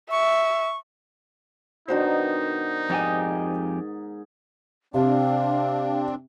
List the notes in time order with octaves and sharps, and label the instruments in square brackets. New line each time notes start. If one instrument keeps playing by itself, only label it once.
[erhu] E5 [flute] C#6
[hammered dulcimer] B2 D#3 [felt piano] D4 F#4 C5 [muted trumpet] D#4
[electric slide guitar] F2 G4 G#5 [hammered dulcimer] G#2
[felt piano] C3 [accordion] C4 D4 [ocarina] F5